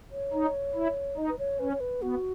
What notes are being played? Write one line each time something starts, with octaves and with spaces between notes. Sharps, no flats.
C#5
D#4
E4
D#4 D#5
B4
C#5
C#4 B4
C#5
B4
B3 F#4